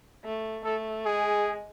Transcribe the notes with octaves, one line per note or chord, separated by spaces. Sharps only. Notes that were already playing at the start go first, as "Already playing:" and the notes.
A3
A3 A4
G#3 G#4